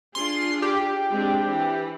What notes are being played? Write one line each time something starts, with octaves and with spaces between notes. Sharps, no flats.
D4 F4 G#4 C6
G4
G#3 C4 D4
E3